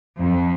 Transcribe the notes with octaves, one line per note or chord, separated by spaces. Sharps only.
F2